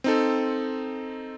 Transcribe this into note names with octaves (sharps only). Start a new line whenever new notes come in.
C4 D#4 A4